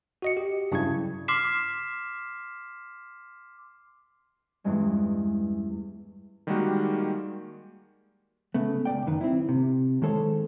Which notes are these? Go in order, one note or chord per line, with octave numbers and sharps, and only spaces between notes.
F#4 D#5 C#7
G4
G2 C#3 F#3 E4 G#6
C6 D6 F6 B6 C7 E7
E2 G2 G3 G#3 C#4
D#3 G3 G#3 A#3 F#4 G4
C#3 A3 B3
C#2 F#2 D5 G5
F#2 D#3 B4
C4 E4
C3
D#3 G#3 A4 C5 C#5